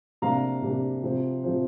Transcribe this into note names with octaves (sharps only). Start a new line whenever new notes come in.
C3 G3 A#3 D4 F5 A#5
C3 G3 A#3 D4
C3 F3 C4
C3 F3 C4